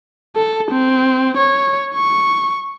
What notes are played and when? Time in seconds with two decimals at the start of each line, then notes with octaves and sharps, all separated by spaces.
0.36 A4
0.71 C4
1.37 C#5
1.95 C#6